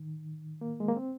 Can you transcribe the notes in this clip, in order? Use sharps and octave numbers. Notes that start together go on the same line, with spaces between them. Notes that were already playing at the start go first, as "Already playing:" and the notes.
Already playing: D#3
A#3
G#3
A#3
C4